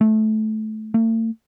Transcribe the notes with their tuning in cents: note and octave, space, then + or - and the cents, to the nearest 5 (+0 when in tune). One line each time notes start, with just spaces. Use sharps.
A3 -20
A3 +45